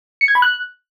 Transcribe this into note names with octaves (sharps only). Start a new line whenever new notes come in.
C#7
G#6
B5
F#6